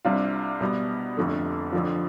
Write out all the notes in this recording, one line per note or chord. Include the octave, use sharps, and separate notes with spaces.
C2 C3 G3 D4 F4
B2 G3 B3
F1 F2 D3 A3
F2 D3 F3